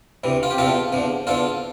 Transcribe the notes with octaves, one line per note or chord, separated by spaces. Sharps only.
D2 C3 E3
F4
G4
E2 C3 F3 F4 A4
E2 D3 F3
E2 D3 F3 F4 A4